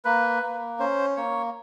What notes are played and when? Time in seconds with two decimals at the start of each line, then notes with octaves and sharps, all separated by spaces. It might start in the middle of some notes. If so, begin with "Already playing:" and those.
0.05 A#3 B4
0.43 A#3
0.79 C#4 C5
1.16 A#3 C#5